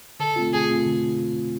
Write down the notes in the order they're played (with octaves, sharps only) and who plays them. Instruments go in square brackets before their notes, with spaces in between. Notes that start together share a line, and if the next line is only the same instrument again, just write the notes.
[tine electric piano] D3 [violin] A4
[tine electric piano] A3 C4 F4
[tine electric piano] D3 [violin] G#4
[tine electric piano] A3 C4 F4
D3